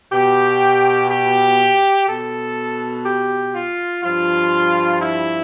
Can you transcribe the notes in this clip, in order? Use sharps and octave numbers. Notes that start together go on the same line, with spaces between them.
B2 G4
G4
B2 A4
G4
F4
G2 F3 F4
E4